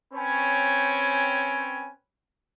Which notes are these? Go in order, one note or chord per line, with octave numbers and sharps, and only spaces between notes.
C4 C#4 B4 C#5 G5 G#5